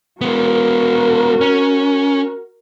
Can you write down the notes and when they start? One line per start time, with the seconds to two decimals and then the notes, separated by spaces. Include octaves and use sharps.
0.21 G#3 B3 F#4 A#4
1.41 C#4